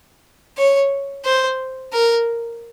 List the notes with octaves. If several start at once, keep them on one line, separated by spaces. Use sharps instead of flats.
C#5
C5
A#4